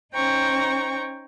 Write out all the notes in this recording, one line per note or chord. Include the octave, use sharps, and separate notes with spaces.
C#4 D#4 C5 G5 A#5 C#6